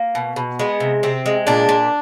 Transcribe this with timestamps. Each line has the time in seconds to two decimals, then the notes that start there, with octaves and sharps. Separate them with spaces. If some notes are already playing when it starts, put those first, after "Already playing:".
Already playing: A#3
0.15 B2
0.36 B2
0.59 G#3 B3
0.80 C3
1.03 C3 C4
1.26 G#3
1.47 A#2 D4
1.69 A#2